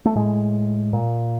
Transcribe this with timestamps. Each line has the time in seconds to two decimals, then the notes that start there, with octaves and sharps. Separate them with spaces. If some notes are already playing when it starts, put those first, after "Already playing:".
0.05 A3
0.15 A2 G#3
0.93 A#2